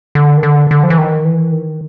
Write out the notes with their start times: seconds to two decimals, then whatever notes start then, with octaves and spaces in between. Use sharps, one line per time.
0.15 D3
0.37 D#3
0.43 D3
0.71 D3
0.83 F3
0.90 E3
0.98 D#3
1.25 E3
1.52 D#3